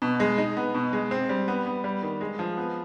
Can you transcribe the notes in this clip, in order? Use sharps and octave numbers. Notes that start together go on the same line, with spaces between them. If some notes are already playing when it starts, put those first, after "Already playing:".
B2
G#3
D#4
B3
B2
G#3
C4
G3
B3
B3
G3
D#3
G#3
F3
B3